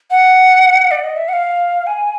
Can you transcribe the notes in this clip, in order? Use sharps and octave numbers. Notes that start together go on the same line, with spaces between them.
F#5
D5
D#5
E5
F#5
F5
G#5